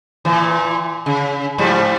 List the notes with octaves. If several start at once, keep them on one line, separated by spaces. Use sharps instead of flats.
A#2 E3
C#3
G#2 F3 G3